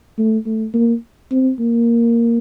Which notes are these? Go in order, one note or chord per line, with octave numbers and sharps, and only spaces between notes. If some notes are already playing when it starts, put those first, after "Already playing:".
A3
A3
A#3
C4
A#3